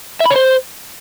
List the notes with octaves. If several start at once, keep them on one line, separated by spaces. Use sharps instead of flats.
E5
B5
C#5
C5